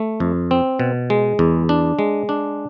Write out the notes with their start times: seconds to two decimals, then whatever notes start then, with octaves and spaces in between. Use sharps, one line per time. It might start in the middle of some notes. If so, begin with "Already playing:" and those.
Already playing: A3
0.20 F2
0.51 C4
0.79 B2
1.10 G#3
1.39 E2
1.69 D4
1.99 G#3
2.29 D4